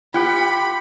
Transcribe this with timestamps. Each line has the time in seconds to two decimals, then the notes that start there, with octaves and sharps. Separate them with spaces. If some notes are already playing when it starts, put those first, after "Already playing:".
0.14 F4 G4 F#5 G5 B5